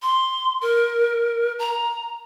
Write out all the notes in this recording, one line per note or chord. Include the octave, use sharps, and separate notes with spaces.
C6
A#4
A#5